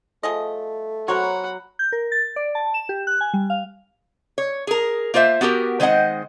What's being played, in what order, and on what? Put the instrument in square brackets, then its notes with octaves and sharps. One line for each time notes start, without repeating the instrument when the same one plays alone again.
[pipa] F3 G#4 D#5 [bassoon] A3
[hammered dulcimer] F#3 [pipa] A#4 C5 C#5 [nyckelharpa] F#5 B5
[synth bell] G6
A#4
A6
D5
A5
E7
G4
F#6
G#5
G3
F5
[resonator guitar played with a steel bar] C#5
G#4 A#4
A#3 F4 C5 C#5 E5
B3 F#4 G4 A#4
D#3 G#3 C4 D#5 F#5